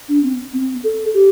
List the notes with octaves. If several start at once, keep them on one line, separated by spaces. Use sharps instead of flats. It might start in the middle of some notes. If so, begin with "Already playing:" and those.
D4
C4
C4
A4
G4